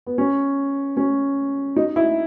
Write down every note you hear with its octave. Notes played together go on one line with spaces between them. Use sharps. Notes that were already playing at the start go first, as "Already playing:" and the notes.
B3
C#4
C#4
D#4
E4